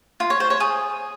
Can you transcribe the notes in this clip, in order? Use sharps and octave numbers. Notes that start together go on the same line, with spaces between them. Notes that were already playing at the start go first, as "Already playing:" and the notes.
F4
C#5
C5
C#5
G#4